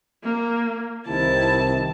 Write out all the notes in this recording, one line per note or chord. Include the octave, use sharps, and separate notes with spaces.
A#3
C2 C3 D#3 E4 A5